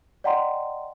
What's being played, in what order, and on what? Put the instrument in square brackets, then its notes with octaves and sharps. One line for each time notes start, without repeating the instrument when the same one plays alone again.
[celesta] D5 D#5 F#5 G5 A#5 C6